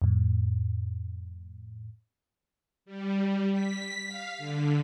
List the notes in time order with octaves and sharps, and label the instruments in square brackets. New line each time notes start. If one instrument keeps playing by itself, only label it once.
[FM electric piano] F2 A2
[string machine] G3
B6
F5
D3